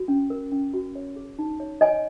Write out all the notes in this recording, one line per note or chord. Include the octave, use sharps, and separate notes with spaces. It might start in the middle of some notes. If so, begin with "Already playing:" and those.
Already playing: F#4
C#4
A#4
C#4
F#4
C#5
G#4
D#4
C#5
C#5 D#5 G#5